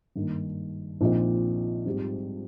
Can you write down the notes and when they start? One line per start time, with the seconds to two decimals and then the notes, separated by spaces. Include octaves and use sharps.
0.15 G#1 G2 D#3 A#3
1.01 A#1 A#2 F3 C4 D#4
1.85 G#2 G3 C4 G4